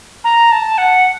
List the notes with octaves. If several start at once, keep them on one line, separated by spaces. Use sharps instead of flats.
A#5
A5
F#5